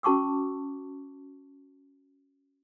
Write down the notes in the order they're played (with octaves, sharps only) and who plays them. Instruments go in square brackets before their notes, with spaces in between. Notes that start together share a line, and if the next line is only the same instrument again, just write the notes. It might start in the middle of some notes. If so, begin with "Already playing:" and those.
[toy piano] C#4 F#4 A5 C#6 D6 E6